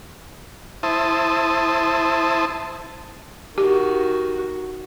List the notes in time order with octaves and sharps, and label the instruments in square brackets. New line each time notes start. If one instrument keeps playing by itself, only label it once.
[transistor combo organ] E4 C5 A5 D#6
[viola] D#3 F#4 [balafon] G4